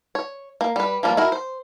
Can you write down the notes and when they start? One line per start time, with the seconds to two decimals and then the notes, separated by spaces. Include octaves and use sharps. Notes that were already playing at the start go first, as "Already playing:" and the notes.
0.15 C#5
0.61 A#3
0.76 G3 B4
1.03 F3 G3 A#3
1.17 E4 F#4 A#4
1.32 C5